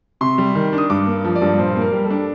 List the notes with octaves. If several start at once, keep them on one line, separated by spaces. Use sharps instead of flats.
C3 C6
G3
D#3
D4
D#6
G2 D6
A#3
F3
D5
G2
A#2 C5
A#3 A#4
G3
A4
D4